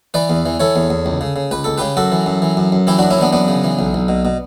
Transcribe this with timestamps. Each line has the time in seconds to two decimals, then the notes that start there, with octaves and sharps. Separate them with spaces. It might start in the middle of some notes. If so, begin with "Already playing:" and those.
0.14 E3 B4 D5
0.30 E2
0.46 E3
0.60 E3 A4 C#5
0.76 E2
0.90 E2
1.06 C#2
1.21 C#3
1.36 C#3
1.51 C#2 B4
1.64 C#2 A4
1.78 C#3 G4 B4
1.97 F#2 F#4 A4
2.12 E3
2.26 F#2
2.42 E3
2.57 F#2
2.72 F#2
2.87 E3 E4 G4
2.99 F#2 D4 F#4
3.10 C#4 E4
3.18 E3 B3 D4
3.33 F#2 B3 D4
3.48 C#3
3.64 E3
3.79 B1
3.94 B1
4.08 B2
4.25 B2